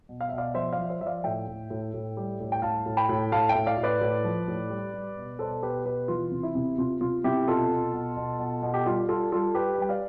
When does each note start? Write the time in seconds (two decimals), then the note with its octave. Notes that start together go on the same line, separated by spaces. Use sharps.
0.09 B2
0.21 F5
0.29 B2 E5
0.38 D5 F5
0.54 F3 C5 E5
0.73 D5 F5
0.78 F3
0.89 C5 E5
1.01 F3 E5
1.06 D5 F5
1.24 A2 E5 G5
1.47 A2
1.70 A2
1.94 A2
2.17 G3
2.40 A2
2.52 G5
2.62 A2 F5 A5
2.86 A2
2.97 G5 B5
3.09 A2
3.32 A2 F5 A5
3.49 E5 G5
3.55 A2
3.66 D5 F5
3.77 A2
3.83 B4 D5
4.01 A2
4.24 F3
4.48 A2
4.70 G3
4.94 G3
5.17 B2
5.39 B2 A4 C5
5.63 B2 G4 B4
5.85 B2 G4 B4
6.08 E3 F4
6.31 C3
6.43 E4
6.55 C3
6.78 C3 F4
7.01 C3 F4
7.24 C3 E4 G4
7.47 B2 F4 A4
7.71 B2
7.93 B2
8.17 B2
8.39 B2
8.62 B2
8.74 G4
8.85 G3 F4
9.08 G3 F4 A4
9.32 G3 F4 A4
9.55 G3 G4 B4
9.78 G3 G5
9.89 D5 F5